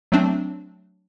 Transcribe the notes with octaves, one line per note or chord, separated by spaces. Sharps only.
F#3 A3 C4 D4